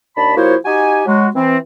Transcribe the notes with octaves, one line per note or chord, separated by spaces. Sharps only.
D#2 D4 A5 B5
F3 A#3 E4 F#4 C5 C#5
D#4 F#4 G4 G#5
F#3 G#3 F#4
E3 C4